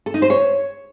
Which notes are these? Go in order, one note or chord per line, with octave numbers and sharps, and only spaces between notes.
A4
D#4
C5
C#5